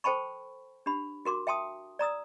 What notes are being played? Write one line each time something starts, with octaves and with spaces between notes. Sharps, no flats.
A4 C5 G5 A5 B5 C#6
D4 G4 B5
F#4 A#4 C6 D6
E5 G5 A5 C6 D#6
D5 A#5 D#6 E6